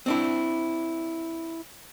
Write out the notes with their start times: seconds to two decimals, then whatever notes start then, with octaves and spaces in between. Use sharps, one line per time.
0.06 C4 D4 E4